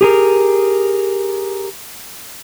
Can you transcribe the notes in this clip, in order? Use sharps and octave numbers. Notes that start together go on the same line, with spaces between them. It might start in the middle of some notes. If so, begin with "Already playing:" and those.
G4 G#4 A#4